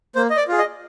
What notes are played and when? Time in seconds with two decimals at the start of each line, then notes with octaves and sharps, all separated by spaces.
0.16 A#3 C5
0.30 D#5
0.37 D5
0.48 F4 G#4
0.58 D#5